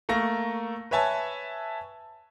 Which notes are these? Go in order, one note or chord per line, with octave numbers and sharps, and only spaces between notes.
A3 A#3 C#6 A#6
B4 C#5 E5 G#5 A5